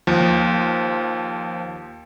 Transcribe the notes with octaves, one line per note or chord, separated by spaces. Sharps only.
D#2 F3